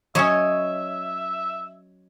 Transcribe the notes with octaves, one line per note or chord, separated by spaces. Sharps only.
F#3 C#4 C#5 D#5 E5